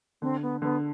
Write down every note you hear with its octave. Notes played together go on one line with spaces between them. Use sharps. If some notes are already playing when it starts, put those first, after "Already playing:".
D3 C4
B3
D3 B3